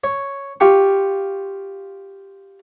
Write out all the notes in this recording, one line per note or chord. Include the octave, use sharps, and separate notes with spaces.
C#5
F4 G4 G5 C#6